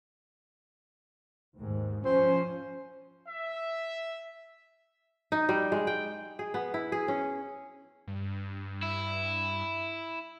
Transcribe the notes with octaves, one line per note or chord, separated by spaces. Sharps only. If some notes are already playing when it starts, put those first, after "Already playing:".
D#2 G#2
F3 C#4 C5
E5
D#4
G3
G#3
G5
G#4
B3
E4
G#4
C#4
G2
E4